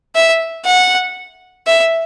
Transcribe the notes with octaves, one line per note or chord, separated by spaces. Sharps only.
E5
F#5
E5